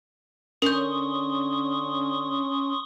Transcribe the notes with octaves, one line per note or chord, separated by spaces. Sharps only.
D3 C#4 A#4 C6 C#6 D#6 G6